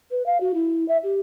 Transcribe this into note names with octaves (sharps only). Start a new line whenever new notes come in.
B4
F5
F#4
E4
E5
G4